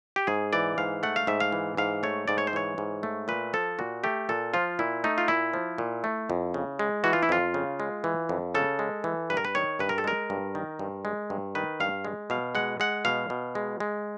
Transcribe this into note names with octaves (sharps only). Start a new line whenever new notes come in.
G4
G#2 G#4
E3 D5
G#2 F5
A3 F#5
F5
G#2 E5
F5
E3
G#2 F5
A3 C#5
G#2 D5
C#5
C5
E3 C#5
G#2
A3
A#2 B4
F3 A4
A#2 F#4
A3 G4
A#2 A4
F3 F4
A#2 E4
A3 D#4
F4
A#2 E4
F3
A#2
A3
F2
C#3
G#3
E3 F#4
F4
E4
F2 F4
C#3
G#3
E3
F2
C#3 A4
G#3
E3
G2 B4
A#4
B4
D#3 C#5
G2 B4
A#4
A4
G#3 A#4
G2
D#3
G2
G#3
G2
D#3 B4
G2 F5
G#3
B2 F5
G#3 F#5
G#3 F#5
B2 F5
B2
G#3
G#3